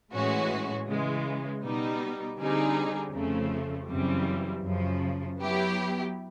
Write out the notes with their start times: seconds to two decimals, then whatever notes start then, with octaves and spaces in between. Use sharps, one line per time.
0.12 A2 E3 G#3 C#4 F#4
0.87 C#3 E3 G#3
1.62 B2 G3 B3 D#4
2.38 D3 G3 C4 D#4 G#4
3.13 F2 C#3 F3 A3
3.89 F#2 C#3 E3 G3 C4
4.64 F#2 C#3 F3
5.39 F#3 B3 E4 G4